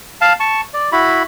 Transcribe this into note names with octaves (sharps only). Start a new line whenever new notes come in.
F5 A5
A5 C#6
D5
E4 F#4 B5